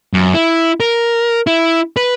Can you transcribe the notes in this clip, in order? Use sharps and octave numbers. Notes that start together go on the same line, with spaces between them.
F#2
E4
A#4
E4
B4